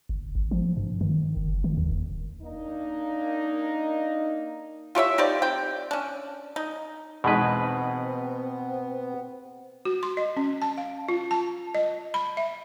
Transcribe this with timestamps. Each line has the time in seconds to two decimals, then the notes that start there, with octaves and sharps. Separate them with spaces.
0.09 G1
0.35 G#1
0.51 F3
0.77 G2
1.01 D#3
1.37 F#1
1.64 D#3
1.77 D#2
1.91 E1
2.42 A#3 D4 D#4
4.95 F4 G4 C#5 E5
5.18 D#4 G4 C5 D5
5.42 C4 G5
5.91 C#4 D4
6.56 D#4
7.24 E2 B2 G#3 B3 C4 D#4 B4
9.85 F#4
10.03 C6
10.17 D#5
10.37 C#4
10.62 A5
10.78 F5
11.08 F4
11.31 A5
11.75 D#5
12.14 B5
12.37 E5